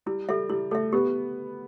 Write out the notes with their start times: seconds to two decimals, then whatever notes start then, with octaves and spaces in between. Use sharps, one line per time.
0.06 G3 E4
0.29 G3 A4 E5
0.49 G3 E4
0.71 A3 A4 E5
0.93 B3 G4